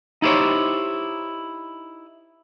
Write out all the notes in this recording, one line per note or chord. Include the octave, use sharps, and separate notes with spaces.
D#4 E4 G4 C5 C#5